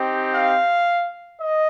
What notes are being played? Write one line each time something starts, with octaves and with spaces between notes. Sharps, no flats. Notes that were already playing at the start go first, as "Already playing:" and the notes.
Already playing: C4 D#4 G4
F5
D#5